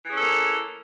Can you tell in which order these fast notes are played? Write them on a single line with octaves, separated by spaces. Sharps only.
E3 G#4 C#4 A4 A#3